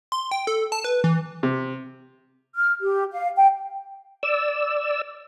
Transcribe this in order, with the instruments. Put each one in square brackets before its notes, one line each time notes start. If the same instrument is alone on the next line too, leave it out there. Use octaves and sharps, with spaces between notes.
[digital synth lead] C6
G5
A4
A5
B4
E3
[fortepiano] C3
[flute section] F6
G4
F5
G5
[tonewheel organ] D5 E6